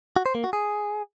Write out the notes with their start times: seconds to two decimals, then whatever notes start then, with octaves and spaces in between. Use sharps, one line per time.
0.16 F#4
0.26 C5
0.35 A#3
0.44 F#4
0.53 G#4